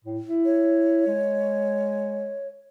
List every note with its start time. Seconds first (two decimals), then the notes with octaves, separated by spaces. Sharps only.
0.04 A2
0.27 E4
0.45 C#5
1.07 G#3